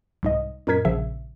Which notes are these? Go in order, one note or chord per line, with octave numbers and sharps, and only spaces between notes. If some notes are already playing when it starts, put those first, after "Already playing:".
C2 G#2 D#5
F#2 A#2 D#4 A#4 G#6 B6
A#1 A#2 C#3 F3 E5